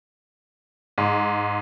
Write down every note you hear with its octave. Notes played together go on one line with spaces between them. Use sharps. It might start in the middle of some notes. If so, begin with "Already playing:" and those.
G#2